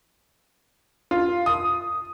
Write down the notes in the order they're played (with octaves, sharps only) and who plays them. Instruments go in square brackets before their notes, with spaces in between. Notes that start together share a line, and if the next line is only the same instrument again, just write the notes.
[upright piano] F4
D#6